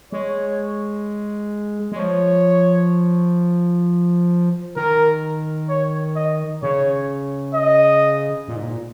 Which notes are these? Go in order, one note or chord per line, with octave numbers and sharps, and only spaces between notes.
G#3 C#5
G#3
F3 C#5
D#3 A#4
C#5
D#5
C#3 C#5
D#5
A#2
G#2
A#2